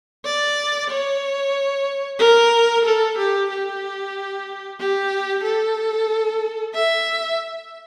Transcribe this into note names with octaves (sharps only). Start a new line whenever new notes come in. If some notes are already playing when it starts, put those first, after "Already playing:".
D5
C#5
A#4
A4
G4
G4
G4
A4
E5